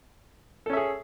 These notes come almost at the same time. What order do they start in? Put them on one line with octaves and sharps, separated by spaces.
A4 C#4 E5 G#4